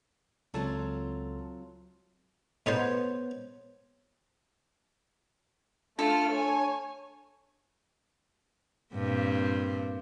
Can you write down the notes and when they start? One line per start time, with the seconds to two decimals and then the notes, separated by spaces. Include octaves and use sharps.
0.54 C#2 F#3 C4 F4 A4 A5
2.66 A2 B3 D#4 C5 C#5 A5
5.99 A3 D4 F4 A4 F6
6.31 C#5 G#5
8.94 G2 A#2 C4